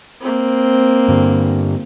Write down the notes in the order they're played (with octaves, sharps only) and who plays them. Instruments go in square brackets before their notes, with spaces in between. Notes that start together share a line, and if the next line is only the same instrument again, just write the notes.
[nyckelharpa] A#3 C4
[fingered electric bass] G2 D3 G3